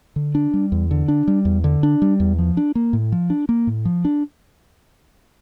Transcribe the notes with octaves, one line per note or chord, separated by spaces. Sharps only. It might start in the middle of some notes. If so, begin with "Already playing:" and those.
D3
D4
G3
E2
D3
D4
G3
E2
D3
D4
G3
E2
F3
D4
A#3
A2
F3
D4
A#3
A2
F3
D4